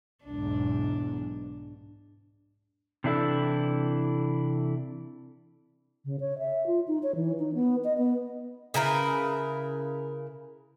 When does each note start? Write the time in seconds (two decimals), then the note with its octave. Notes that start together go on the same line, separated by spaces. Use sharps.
0.25 B1 E2 G#2 D4
3.04 C3 E3 D4 E4 A4
6.05 C#3
6.20 C#5
6.39 E5
6.67 F4
6.88 D#4
7.03 C#5
7.15 E3
7.39 D#4
7.54 B3
7.84 D#5
7.98 B3
8.74 C#3 E4 A#4 B4